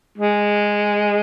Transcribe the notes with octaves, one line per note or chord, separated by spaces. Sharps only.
G#3